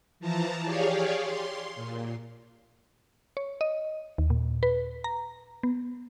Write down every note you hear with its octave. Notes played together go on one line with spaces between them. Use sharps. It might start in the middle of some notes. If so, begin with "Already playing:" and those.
E3 F3 A5 A#5
G4 G#4 C#5 D5 F5
C6
A#2
C#5
D#5
D#2
A#2
B4
A#5
B3